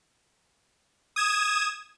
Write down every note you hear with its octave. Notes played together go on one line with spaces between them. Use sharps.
D#6 G#6 E7